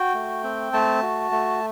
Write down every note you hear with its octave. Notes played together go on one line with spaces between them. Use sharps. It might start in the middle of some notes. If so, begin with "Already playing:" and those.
Already playing: F#4 G5
A3
C4
A3 A5
F#4
A3